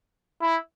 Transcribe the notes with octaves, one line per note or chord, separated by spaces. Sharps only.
E4